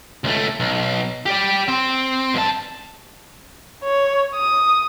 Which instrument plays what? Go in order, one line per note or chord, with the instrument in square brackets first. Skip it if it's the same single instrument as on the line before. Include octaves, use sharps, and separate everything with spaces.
[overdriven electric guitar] C#2 A3
B1
G4 D5
C4
G2 A5
[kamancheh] C#5
D#6